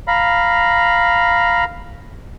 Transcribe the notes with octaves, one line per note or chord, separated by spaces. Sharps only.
F5 A#5 B5